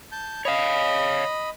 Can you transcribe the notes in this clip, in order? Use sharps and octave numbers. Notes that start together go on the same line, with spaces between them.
A5 G6
C#5 D#5 F5 B5